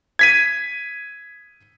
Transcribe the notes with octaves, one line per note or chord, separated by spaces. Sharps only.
G#6 B6 D#7